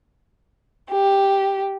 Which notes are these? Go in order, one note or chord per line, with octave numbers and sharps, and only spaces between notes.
G4